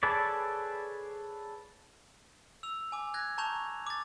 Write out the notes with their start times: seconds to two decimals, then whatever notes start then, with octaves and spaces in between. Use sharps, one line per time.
0.03 G#4 A4 B4 C#5 D5
2.63 E6 F7
2.92 G#5 D6
3.14 F#6 G#6 A#6
3.38 A5 A#5 C#6 G6 F7
3.87 D6 A6